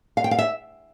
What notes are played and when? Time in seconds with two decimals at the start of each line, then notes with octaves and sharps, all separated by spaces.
0.17 F5
0.24 G5
0.31 F5
0.39 E5